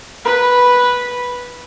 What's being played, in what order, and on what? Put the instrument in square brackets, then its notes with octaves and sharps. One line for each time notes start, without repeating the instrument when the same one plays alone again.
[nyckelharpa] B4 B5